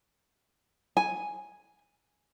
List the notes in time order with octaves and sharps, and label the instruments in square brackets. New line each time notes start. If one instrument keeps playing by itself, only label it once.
[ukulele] G#5